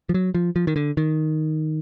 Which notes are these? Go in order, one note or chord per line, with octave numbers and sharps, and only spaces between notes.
F3
F#3
F3
F3
D#3
D3
D#3